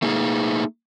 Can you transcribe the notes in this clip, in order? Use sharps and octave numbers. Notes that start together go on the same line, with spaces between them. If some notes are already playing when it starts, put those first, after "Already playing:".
A3 A#3 D#4 G#4